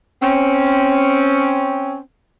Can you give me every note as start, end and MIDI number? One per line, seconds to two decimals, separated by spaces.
0.22 1.98 60
0.22 1.98 61